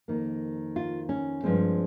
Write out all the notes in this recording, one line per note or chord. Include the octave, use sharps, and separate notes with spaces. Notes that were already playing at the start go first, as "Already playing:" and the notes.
F2 D#3 A#3
F4
C#4
G2 F3 G#3 C4